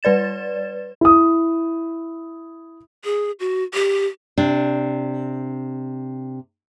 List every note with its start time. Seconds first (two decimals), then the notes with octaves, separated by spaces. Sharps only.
0.03 G3 B4 D5 A6 E7
1.01 E4 D#6
3.05 G#4
3.40 F#4
3.74 G4
4.38 C3 D4